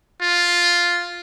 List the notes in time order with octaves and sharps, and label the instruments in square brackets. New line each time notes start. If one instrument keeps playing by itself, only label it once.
[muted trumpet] F4